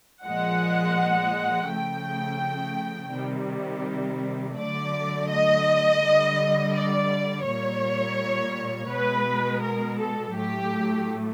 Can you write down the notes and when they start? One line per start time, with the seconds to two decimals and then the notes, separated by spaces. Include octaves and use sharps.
0.24 A#2 F3 G#3 F#5
1.69 C#3 F3 A3 G5
3.13 C3 D#3 G3
4.57 D3 F#3 A3 D5
5.30 D#5
6.02 D3 G3
6.74 D5
7.45 A#2 G3 C#5
8.90 B2 G#3 B4
9.62 A#4
9.98 A4
10.34 A2 F#3 A3 G4